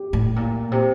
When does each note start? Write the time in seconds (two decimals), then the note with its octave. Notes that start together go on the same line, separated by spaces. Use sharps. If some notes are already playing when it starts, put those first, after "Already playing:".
Already playing: G4
0.13 A2
0.36 A#2
0.72 C3